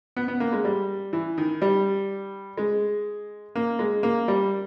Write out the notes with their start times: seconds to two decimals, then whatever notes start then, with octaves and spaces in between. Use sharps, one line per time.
0.16 B3
0.28 B3
0.40 A#3
0.53 G#3
0.65 G3
1.13 E3
1.38 D#3
1.62 G3
2.58 G#3
3.55 A#3
3.79 G#3
4.03 A#3
4.28 G3